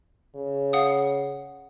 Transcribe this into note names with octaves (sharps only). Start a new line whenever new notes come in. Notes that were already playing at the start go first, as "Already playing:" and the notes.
C#3
F5 F#5 D#6